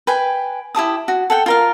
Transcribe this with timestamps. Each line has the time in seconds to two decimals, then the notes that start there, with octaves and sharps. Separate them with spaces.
0.07 B4 G5 G#5
0.75 E4 G4 A5 D#6
1.08 F#4
1.30 A4 F#5 G5
1.46 F4 A#4 F5